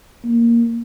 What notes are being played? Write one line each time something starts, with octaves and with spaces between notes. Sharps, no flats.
A#3